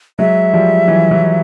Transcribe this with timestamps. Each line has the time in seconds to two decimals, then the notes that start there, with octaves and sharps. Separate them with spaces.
0.19 F#3 G#3 E5
0.53 F3 G3
0.88 E3 F#3
1.11 E3 F#3